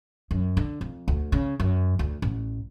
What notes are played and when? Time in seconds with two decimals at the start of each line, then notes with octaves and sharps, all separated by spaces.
0.31 F#2
0.57 D3
0.81 F2
1.08 D2
1.32 C#3
1.60 F#2
1.99 D2
2.22 A1